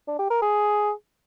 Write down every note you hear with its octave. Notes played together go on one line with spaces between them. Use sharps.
D4
G4
A#4
G#4